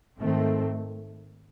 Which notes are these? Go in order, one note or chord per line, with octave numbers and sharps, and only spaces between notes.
G#2 D#3 A3 C4